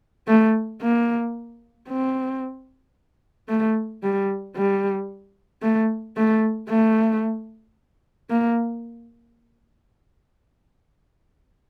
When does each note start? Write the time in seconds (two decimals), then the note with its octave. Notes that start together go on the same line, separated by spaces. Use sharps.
0.28 A3
0.82 A#3
1.89 C4
3.49 A3
4.03 G3
4.57 G3
5.62 A3
6.17 A3
6.69 A3
8.30 A#3